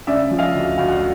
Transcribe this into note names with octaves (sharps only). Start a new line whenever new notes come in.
C#3 D5 E5
F3
D#5 F5
D2
D2 F5
F#5